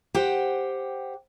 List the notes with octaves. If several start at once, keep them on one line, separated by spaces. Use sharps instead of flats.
G4 C5 F#5 G5